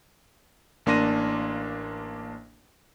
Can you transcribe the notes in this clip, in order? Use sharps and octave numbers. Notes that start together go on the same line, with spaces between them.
A1 A#3 D4 C6 A#6 D#7